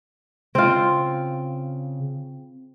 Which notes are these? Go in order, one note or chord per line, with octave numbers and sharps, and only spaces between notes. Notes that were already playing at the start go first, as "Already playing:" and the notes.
C#3 C4 F4